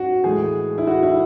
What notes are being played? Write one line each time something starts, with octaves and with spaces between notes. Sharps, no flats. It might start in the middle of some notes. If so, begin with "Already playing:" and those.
Already playing: G#2 C#4 F#4
A2 E3 G#3 G#4
E4
F#4
E4